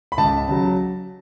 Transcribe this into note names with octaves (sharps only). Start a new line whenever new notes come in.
B5
C#2 A5
C#3 F#3